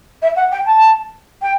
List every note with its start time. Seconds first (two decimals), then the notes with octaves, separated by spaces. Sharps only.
0.22 E5
0.36 F#5
0.52 G5
0.66 A5
1.42 G5